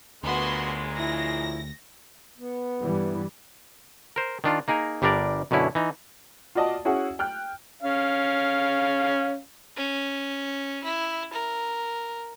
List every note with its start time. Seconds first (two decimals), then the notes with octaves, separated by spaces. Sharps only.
0.24 D2 A#2 C#3 G#3 B3 F#4 C6
0.99 F3 E4 A#6
2.38 B3
2.82 G2 E3 G3
4.16 A#4 C5
4.44 D#3 D4 F4
4.68 A#3 D#4 G#4 A#4
5.02 G1 G3 D4 A#4 D5
5.51 F#2 B2 D3 C#4 E4
5.75 E3 D#4
6.55 F4 F#4 D5 D#5 A5
6.85 C#4 E4 F#4 G#4 F#5
7.19 G5 F6 F#6
7.83 C#4 F5
9.77 C#4
10.84 E4
11.33 A#4